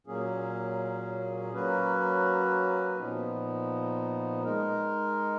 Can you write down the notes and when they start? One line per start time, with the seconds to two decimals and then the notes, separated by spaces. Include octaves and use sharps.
0.07 A#2 F#3 A#3 C#4 G#4
1.52 F#3 A#3 C#4 F#4 B4
2.98 A#2 F3 B3 D#4
4.43 G#3 D#4 A#4